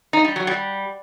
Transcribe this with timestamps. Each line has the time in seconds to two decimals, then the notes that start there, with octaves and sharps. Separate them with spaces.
0.13 D#4
0.25 G3
0.36 F#3
0.47 G3